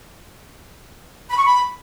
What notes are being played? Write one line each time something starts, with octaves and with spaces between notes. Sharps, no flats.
B5
C#6
B5